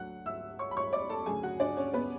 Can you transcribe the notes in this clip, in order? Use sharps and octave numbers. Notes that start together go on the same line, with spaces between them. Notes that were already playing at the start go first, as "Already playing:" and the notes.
Already playing: D2 D3 F#3 F#5 F#6
E5 E6
C#5 C#6
B5
C#5 C#6
D5 D6
A4 A5
D2 C#3 F#3 G#4 G#5
F#4 F#5
D4 D5
C#4 C#5
B3 B4